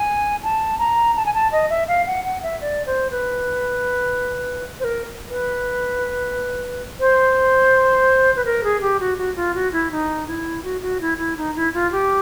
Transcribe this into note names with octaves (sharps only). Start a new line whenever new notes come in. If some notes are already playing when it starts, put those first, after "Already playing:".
Already playing: G#5
A5
A#5
A5
G#5
A5
D#5
E5
F5
F#5
F#5
E5
D5
C5
B4
C5
A#4
B4
C5
B4
A#4
G#4
G4
F#4
F#4
F4
F#4
E4
D#4
E4
F#4
F#4
E4
E4
D#4
E4
F4
G4